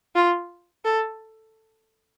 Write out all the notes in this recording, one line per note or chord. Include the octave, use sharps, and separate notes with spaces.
F4
A4